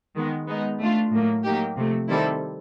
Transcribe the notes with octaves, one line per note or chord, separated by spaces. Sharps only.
D#3 G#3 B3
G#3 B3 D#4
A3 D4 F4
A2 F#3 A#3
F#3 A#3 D#4 G4
C3 F3 A3
D#3 G3 C4 E4 A4